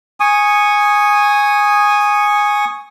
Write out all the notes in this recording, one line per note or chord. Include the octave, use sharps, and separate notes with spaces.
G#5 C#6 D#6